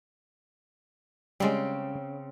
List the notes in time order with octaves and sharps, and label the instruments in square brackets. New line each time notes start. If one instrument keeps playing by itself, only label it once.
[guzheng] C#3 C4 [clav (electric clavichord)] G3 G#3